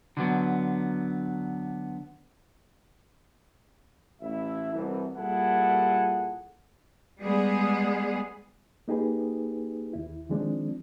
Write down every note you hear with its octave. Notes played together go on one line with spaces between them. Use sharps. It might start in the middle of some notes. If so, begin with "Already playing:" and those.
D3 F#3 B3
A1 E4 E5
C2 B2 E3
A#2 G3 E4 G#4 A4 F#5
G3 G#3 B3 G#4
A#3 D#4 G4 G#4 B4
D#2 E4
D#3 F3 G#3 C4 D4